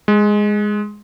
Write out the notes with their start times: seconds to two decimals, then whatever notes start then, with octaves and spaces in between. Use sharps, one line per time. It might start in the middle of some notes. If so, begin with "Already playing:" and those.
0.08 G#3